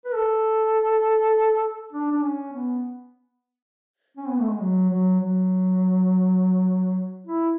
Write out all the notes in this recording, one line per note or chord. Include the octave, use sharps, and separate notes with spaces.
B4
A4
D4
D4
C#4
B3
C#4
B3
A3
G#3
F#3
F#3
F#3
E4